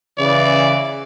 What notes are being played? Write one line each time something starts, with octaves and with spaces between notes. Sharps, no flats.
C#3 E3 D5